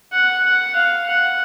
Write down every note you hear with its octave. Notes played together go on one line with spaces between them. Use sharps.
F#5
F#5
F5
F#5